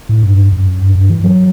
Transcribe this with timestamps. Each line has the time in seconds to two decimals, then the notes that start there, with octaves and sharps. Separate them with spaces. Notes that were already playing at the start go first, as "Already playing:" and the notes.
0.09 A2
0.23 G2
0.52 F#2
0.81 G2
0.95 G2
1.10 E3
1.24 F#3